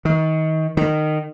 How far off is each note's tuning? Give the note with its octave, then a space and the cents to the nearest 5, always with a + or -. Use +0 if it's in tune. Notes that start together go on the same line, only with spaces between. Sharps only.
D#3 +30
D#3 -20